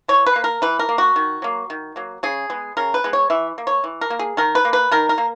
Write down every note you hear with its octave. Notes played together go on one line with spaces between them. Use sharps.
E3 C#5
B4
A#3
A#4
E3 B4
A#4
A#3
F#4
D#3
F#3 A#3
D#3
F#3 A#3
C#3 G#4
G#3 B3
C#3 A#4
B4
G#3 B3
C#5
E3 E5
A#3
C#5
E3
A#4
A#3
G#4
D#3 A#4
B4
A#3
B4
D#3 A#4
A#4
A#3